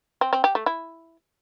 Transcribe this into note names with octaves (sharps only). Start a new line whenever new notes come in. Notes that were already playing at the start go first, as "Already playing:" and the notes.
C4
C4
G4
A3
E4